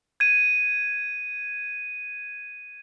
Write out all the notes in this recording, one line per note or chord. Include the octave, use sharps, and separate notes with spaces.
G#6 D#7